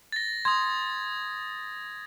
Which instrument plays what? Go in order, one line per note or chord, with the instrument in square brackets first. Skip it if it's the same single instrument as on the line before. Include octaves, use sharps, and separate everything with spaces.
[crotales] A6 A#6
[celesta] C6 [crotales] D#6 G#6